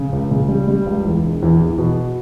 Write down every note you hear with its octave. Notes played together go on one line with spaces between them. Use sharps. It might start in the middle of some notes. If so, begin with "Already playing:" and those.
Already playing: C#3
C#2
C#3
G3
G3
C#2
E2
E1
E2
E2
B2